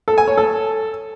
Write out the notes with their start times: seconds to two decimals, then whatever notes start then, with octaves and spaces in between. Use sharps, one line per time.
0.08 A4
0.18 G#5
0.28 C#5
0.38 A4